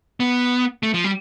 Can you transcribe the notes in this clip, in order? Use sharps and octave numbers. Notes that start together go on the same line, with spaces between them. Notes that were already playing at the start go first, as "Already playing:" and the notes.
B3
A3
F3
G3